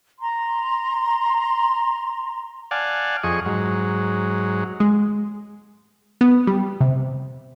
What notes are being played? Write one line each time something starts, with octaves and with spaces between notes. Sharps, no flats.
A#5 C6
D5 F5 F#5 G#5 A5
F2 G#4 D#5 C#6
G#2 F#3
G#3
B3
G3
C3